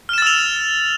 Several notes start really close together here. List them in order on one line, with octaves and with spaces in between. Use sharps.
F6 E7 A6 E6 F7